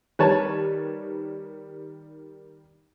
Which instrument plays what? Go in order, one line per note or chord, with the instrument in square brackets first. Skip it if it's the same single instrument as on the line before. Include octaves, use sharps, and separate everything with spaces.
[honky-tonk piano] D#3 G3 [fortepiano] B4 C#5 A5